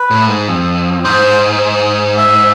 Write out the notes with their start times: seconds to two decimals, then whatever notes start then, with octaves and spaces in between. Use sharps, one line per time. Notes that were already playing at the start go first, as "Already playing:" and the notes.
Already playing: B4
0.11 A2
0.28 G#2
0.48 F2
1.04 G#2 C5
2.18 E5